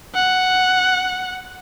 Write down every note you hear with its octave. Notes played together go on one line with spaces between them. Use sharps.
F#5